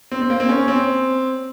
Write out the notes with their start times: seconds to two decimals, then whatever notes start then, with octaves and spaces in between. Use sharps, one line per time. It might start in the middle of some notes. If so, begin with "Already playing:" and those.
0.12 C4
0.22 C4
0.30 A#3
0.40 C4
0.49 C#4
0.68 C4